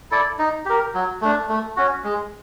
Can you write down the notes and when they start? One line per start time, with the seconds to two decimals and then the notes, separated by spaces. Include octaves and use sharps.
0.11 E4 A4 D5
0.39 D#4
0.66 G4 A#4
0.94 F#3
1.21 A3 D4
1.49 A3
1.77 C#4 F#4
2.04 G#3